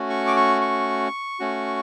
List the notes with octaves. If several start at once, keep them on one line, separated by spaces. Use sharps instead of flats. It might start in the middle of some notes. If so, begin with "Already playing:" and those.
Already playing: A3 C#4 F#4
C#6
D6
C#6
C#6
A3 C#4 F#4